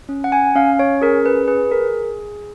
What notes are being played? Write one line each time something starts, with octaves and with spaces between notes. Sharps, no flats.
C#4
F#5
G#5
C#4 F5
C#5
G#4 A#4
B4
G#4 B4
A#4